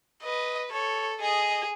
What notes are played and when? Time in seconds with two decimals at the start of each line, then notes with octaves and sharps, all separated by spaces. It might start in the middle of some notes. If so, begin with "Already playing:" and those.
0.23 B4 D#5
0.71 A4 C#5
1.20 G#4 D#5